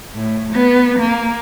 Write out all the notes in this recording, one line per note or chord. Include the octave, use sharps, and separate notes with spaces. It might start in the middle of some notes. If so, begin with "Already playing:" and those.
A2
B3
A#3